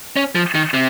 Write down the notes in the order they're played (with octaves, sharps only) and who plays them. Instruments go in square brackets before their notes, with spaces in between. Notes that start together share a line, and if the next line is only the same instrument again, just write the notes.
[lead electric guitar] C#4
F3
D#3
C3